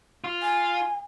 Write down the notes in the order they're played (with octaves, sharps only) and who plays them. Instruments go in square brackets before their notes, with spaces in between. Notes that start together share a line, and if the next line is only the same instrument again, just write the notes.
[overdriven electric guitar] F4
[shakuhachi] G#5